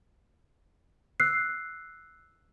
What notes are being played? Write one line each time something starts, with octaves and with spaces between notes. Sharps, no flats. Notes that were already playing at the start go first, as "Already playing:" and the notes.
E6 F#6 C7